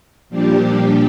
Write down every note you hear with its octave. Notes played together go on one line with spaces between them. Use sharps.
A#2 F3 G3 D4 G4